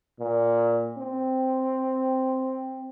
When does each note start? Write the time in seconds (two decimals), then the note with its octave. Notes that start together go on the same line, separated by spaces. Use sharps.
0.20 A#2
0.98 C4